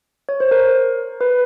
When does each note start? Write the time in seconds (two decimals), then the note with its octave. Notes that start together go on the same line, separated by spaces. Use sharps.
0.29 C#5
0.40 C5
0.51 A#4
1.21 B4